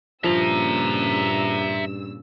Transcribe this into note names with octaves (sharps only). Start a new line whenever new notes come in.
G2 A#2 C#3 F3 E5 A#5 E6